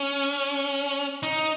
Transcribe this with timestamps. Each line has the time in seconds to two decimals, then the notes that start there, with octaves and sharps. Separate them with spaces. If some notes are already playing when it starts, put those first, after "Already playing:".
Already playing: C#4
1.23 D#4